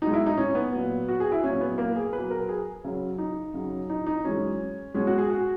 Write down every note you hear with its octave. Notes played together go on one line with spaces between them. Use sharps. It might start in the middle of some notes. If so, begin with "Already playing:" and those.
B2 G#3 D#4
E4
D#4
C#4
B3
A#2 F#3
F#4
G#4
E4
A#2 F#3 C#4
B3
A#3
G#4
B2 B4
F#3
A#4
G#4
F#2 C#3 F#3
D#4
F#2 C#3 F#3
D#4
D#4
F#2 E3 G#3 C#4
B2 G#3 C#4
F#4
G#4
F#4